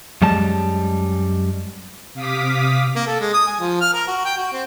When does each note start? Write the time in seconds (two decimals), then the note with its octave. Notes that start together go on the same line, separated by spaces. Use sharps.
0.22 F#2 G3 G#3 A5
2.14 C3 F5 D6 D#6 B6
2.96 A#3
3.07 A4
3.20 G#3
3.33 D#6
3.47 G#5
3.60 F3
3.81 F6
3.94 A#4
4.08 F#4
4.25 G5
4.38 F#4
4.53 C4